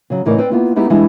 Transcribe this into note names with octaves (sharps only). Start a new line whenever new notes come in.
C#3 F#3
A2 C#3 E3 D#4 A#4 D5
C4 B4 D5 G5
A#3 B3 E4 F4
G#3 B3 D#4 E4 G4 G#4
E3 G3 G#3 D4 E4